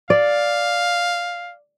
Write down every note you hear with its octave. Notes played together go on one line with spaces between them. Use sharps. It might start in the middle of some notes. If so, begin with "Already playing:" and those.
D5 F5